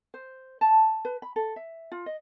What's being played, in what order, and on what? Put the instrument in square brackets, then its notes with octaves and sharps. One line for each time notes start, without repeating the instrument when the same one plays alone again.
[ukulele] C5
A5
B4
B5
A4
E5
F4
D#5